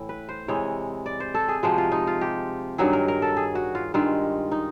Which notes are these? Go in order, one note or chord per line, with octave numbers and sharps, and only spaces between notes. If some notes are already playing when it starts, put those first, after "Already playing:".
Already playing: A2 E3
B4
C5
C3 E3 G#3 C#5
D5
C5
A4
G#4
C3 F3 G#3 F#4
F4
D#4
F4
G4
G2 D#3 F#3 G#4
A#4
A#4
A4
G#4
F#4
F4
G2 D#3 G#3 F4
D#4